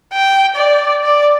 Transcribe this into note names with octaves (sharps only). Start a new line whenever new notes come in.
G5
D5
D5